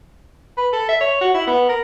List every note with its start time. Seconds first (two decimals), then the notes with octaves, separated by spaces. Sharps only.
0.57 B4
0.73 A4
0.89 E5
1.01 C#5
1.21 F#4
1.34 E4
1.47 B3
1.69 A#4